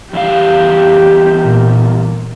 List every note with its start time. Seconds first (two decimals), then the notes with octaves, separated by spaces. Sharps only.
0.13 E2 G3 G4 F5
1.42 A#2